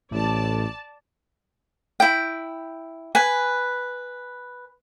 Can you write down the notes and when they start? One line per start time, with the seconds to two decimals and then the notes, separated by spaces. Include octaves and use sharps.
0.12 A1 A2 D5 A5
2.00 E4 G5
3.15 B4 G#5